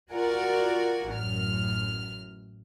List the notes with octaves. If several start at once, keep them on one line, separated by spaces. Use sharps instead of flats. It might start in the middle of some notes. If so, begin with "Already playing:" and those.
F4 F#4 A#4 D5 F#5 G#5
A1 F#2 F6